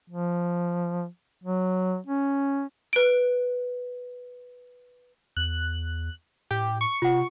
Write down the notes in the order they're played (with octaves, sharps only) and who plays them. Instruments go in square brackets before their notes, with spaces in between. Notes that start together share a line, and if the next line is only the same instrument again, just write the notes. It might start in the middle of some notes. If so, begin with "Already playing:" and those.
[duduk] F3
F#3
C#4
[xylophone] B4 D7
[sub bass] E2 [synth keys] F#6
[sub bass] A2 [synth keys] G4
[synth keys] C#6
[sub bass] C3 [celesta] F4 F#5